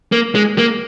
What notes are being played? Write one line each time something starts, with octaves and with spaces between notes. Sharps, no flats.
A#3
G#3
A#3